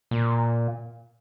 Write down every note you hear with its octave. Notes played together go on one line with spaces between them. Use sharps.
A#2